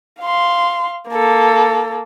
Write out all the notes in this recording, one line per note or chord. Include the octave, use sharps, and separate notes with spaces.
F5 C6
A#3 A4